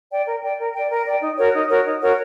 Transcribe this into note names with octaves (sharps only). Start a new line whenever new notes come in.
D5 G5
A#4
D5 G5
A#4
D5 G5
A#4
D5 G5
D#4
F#4 A#4 C#5
D#4
F#4 A#4 C#5
D#4
F#4 A#4 C#5